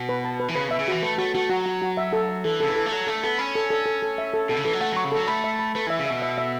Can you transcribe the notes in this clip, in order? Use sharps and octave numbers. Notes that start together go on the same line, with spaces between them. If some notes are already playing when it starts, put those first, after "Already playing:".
Already playing: B2
B4
A5
B4
E3
C#3 B4
B2 E5
C#3
E3 F#4
A3 B4
A3 F#4
A3 F#4
F#3 F#4
F#4
F#4
E5
A4
E5
E3 A4
C#3 A4
E3
A4
A3
F#3 A4
A3 A4
B3 A4
C#4 B5
A4
A4
A4
A4
E5
A4
B2 A4
C#3
E3 A4
F#3
A3 F#5
F#3 C#6
C#3
F#3 A4
A3 B5
E5
B5
A3 B4
E3 E5
C#3
B2 E5
E5
E5